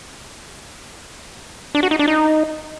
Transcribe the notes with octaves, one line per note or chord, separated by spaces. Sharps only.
D4
F#4
D#4
D4
D#4